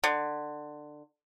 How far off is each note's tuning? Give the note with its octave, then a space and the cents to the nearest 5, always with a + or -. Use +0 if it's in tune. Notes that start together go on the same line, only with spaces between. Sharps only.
D3 +20